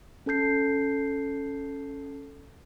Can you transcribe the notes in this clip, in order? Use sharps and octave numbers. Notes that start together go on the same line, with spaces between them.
C#4 A4 A5 G6 C7